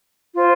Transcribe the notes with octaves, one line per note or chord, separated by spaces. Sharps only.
F4 C5